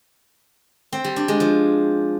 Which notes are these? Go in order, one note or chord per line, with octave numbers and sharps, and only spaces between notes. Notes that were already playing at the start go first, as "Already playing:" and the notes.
C4
G3
D4
G#3
F3